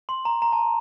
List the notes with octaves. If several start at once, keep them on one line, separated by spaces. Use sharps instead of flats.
C6
A#5
A#5
A5